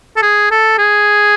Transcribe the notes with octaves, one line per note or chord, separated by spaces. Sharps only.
A4
G#4
A4
G#4